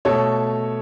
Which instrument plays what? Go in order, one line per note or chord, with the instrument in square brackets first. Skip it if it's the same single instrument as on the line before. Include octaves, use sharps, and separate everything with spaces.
[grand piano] B2 A3 A4 C#5